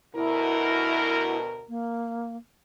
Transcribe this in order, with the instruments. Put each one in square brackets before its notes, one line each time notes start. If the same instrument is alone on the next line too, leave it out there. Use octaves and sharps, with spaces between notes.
[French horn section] D2 B2 A#4 [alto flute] E4
[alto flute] A#3